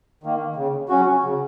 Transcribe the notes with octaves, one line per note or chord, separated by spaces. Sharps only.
D#3 A#3
C#3
F#3 C#4 F#4
C#3